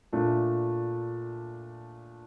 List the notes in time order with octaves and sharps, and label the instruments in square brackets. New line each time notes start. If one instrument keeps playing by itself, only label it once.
[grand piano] A#2 A3 D4